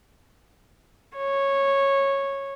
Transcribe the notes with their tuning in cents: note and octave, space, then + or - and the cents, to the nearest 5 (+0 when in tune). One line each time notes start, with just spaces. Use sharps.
C#5 -10